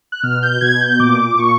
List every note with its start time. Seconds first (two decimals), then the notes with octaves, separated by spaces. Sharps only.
0.12 F#6
0.23 B2 F6
0.43 G6
0.61 B2 G#6
0.81 G6
1.00 A#2 D6
1.39 A#2 C#6